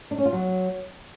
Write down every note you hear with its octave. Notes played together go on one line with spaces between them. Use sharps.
D4
C#4
F4
F#3